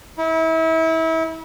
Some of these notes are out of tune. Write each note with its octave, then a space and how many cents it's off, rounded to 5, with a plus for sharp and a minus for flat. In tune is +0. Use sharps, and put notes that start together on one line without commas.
E4 -30